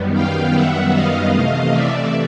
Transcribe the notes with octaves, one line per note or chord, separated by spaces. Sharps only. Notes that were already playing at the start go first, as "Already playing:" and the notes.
Already playing: F#2 D#3 G3 B3
F5 G5
E5 F#5
D#5 F5
C3 E3 A3 D#5 F5
D5 E5